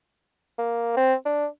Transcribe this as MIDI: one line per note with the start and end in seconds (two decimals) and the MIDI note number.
0.58 0.95 58
0.97 1.14 60
1.25 1.46 62